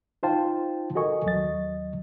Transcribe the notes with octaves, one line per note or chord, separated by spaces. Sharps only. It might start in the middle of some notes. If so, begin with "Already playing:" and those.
D#4 F4 C5 F5 G5 A5
F#4 A4 A#4 D#5 G#5 C#6
D#2 F#3 D#5 A6